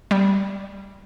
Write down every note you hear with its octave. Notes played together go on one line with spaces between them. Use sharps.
G3